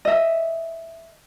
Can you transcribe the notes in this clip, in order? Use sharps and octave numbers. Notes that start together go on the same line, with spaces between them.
D#5 E5